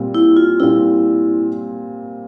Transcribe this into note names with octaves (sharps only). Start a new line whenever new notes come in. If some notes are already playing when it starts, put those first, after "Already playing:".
Already playing: A#2 G3 C4
E4
F4
A#2 G3 C4 E4